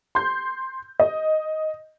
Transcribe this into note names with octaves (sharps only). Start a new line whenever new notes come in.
C6 G6
D#5